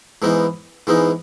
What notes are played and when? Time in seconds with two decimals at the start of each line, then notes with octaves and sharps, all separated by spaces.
0.22 G#2 E3 G#3 B3 D#4
0.87 G#2 E3 G#3 B3 D#4